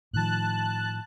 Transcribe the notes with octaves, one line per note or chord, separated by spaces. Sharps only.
A2 D#3 F3 A5 F#6